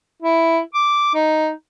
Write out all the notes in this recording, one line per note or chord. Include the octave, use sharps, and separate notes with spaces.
E4
D6
D#4